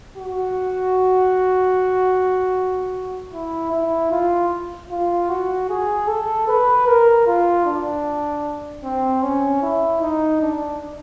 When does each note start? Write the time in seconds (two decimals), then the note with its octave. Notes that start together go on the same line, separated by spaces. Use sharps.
0.17 F#4
3.33 E4
3.72 E4
4.11 F4
4.90 F4
5.29 F#4
5.69 G#4
6.07 A4
6.48 B4
6.87 A#4
7.26 F4
7.66 D4
8.84 C4
9.22 C#4
9.62 E4
10.01 D#4
10.42 D4